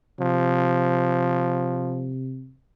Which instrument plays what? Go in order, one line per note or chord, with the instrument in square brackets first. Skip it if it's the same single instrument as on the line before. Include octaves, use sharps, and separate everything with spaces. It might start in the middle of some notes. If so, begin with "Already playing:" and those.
[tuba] C3 [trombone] F3